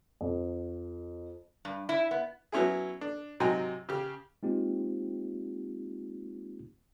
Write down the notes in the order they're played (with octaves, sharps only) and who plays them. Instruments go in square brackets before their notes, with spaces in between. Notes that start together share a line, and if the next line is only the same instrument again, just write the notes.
[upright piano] F2
[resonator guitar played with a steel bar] G2
E4
B3
[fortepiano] F#3 B3 C#4 E4 G#4
D4
G#2 C3 F#3 D#4 G5 G#5
C#3 G4
[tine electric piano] G#3 A#3 C4 D#4 F4 G4